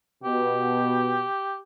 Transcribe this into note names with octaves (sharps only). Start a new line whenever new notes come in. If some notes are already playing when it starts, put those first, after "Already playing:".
B2 G4